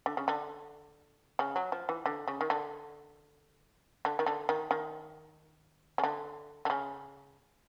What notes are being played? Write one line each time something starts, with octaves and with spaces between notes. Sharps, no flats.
D3
C#3
D3
C#3
F#3
F3
E3
D3
C#3
D#3
D3
D3
D#3
D3
D#3
D#3
C#3
D3
D3
C#3